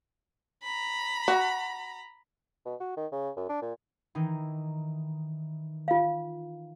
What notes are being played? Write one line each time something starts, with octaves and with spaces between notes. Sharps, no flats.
A#5 B5
F#4
B2
F#4
D#3
C#3
F#2
D4
A#2
D#3 E3 D#4
F4 F5